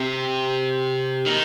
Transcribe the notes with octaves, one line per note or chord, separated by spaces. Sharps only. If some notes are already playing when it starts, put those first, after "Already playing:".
Already playing: C3
D#3